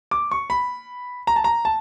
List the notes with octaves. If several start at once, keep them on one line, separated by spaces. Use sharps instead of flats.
D6
C#6
B5
A#5
A5
A#5
A5